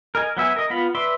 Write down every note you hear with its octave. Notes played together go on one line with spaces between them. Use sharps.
A#4 D#5 G#5
F#3 B3 E5 G#5
A#4 D#5
B3 F4 B5
B4 D5 E5 C6